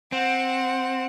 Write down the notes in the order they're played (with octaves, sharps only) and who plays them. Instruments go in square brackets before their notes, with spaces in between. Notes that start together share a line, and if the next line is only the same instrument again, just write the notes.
[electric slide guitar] C4 [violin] F#5